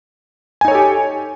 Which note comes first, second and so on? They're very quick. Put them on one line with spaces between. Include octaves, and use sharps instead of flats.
G#5 D#4 C#5 A4 G4